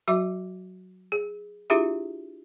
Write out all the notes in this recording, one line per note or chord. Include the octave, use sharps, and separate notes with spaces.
F#3 F#4 E5 D6
G#4
D4 E4 F4 G4 G#4 E5